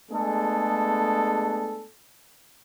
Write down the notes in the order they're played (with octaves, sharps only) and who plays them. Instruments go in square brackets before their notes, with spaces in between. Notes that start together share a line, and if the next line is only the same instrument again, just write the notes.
[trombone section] G#3 A3 B3 D4 G#4 A4